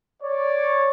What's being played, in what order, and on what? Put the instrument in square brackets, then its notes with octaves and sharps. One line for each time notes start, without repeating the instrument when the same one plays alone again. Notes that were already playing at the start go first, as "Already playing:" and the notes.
[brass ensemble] C#5 D5